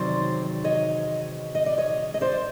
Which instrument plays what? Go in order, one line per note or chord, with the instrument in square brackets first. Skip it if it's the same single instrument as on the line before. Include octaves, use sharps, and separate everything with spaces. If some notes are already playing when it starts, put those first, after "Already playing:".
Already playing: [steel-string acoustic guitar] E2 C3 D#3 F#3 C5 D5
C#5 D#5
D#5
D5
C#5 D#5
D#5
C5 D5